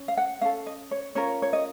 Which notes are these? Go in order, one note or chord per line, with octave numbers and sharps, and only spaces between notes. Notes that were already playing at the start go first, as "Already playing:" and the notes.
Already playing: C#4
F5
F#5
C#4 A4 F5
D#5
C#5
C#4 F4 A#4 C#5
C#5
D#5